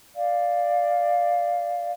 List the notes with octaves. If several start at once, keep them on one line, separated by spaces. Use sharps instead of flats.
D5 F5